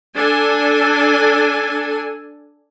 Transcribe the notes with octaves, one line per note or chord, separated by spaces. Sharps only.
D4 A4 G#5